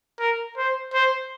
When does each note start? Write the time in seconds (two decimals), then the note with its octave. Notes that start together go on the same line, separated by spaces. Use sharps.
0.20 A#4
0.58 C5
0.94 C5